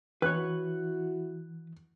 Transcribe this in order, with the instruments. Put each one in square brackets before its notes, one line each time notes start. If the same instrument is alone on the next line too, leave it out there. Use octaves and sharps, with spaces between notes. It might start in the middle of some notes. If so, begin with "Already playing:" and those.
[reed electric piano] E3 [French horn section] E4 F#4 [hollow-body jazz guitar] B4 C#5 [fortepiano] F#6